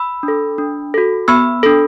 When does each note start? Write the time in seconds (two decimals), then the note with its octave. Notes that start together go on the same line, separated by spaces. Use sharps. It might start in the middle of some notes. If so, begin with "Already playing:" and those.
Already playing: B5 E6
0.23 D4
0.28 A4
0.58 D4
0.94 F#4 A4
1.28 B3 B5 E6
1.63 D4 A4